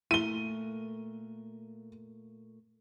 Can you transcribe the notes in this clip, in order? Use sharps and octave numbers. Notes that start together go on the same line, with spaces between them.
A#2 A3 E4 A#4 D#7 G7